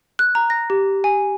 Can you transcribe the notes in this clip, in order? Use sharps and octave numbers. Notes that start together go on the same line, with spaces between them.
F#6
A#5
A#6
G4
G#5